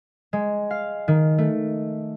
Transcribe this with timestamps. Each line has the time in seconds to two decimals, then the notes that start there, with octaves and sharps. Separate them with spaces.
0.33 G#3
0.71 F5
1.08 D#3
1.38 A3